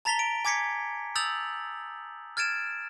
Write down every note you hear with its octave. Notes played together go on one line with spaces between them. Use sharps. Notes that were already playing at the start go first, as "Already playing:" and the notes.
A5 A#5 A6 B6 F7 G7
D7
G#5 D6 G#6 B6 C#7
D#6 E6 G6 A6 F7 F#7
F6 G#6 A6 D7 E7